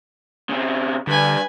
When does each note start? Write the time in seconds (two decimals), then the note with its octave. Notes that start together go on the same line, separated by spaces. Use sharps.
0.49 C#3 C4
1.07 G2 D3 B4 G#5